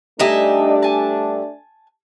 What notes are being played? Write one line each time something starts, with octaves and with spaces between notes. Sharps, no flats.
G2 A3 D4 D#4 G4 D#5 E5 G#5
G#5 A5